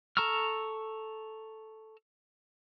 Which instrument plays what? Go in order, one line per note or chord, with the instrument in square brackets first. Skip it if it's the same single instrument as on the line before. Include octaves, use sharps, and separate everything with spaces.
[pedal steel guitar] A4 A#5 C#6 E6 F6